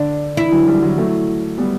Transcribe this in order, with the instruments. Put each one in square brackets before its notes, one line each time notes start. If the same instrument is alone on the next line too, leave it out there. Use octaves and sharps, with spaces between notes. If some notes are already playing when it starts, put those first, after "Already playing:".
Already playing: [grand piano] D3 [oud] D4
[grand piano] E3 [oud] E4
[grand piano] D3 F#3
E3 G3
D3 F#3
F#3 A3
G3 B3